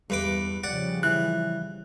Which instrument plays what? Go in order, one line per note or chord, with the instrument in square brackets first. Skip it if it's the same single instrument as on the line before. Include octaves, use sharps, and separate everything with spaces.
[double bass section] E2 [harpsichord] G2 B4 D6
[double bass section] C#3 F3 G3 [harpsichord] D5 F#5
[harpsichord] E3 [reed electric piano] F#6